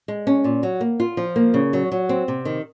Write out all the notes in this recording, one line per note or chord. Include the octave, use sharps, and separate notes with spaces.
G#3
C#4
A#2
F#3
A#3
F4
F3
A#3
C#3
F#3
F#3
C4
C3
D#3